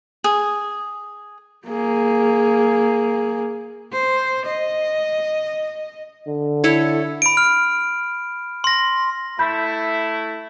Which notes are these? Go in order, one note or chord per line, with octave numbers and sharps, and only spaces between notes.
G#4
A#3 G#4
C5
D#5
D3
E4 A4 C#5
B5 D7
F6
C6 A#6
A3 E4 B5 G6